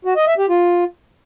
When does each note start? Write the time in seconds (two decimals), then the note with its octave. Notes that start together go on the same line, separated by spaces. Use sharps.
0.05 F#4
0.16 D#5
0.27 E5
0.38 G4
0.49 F4